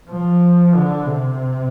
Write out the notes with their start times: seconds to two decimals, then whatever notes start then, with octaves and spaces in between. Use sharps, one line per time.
0.11 F3
0.74 D3
1.06 C3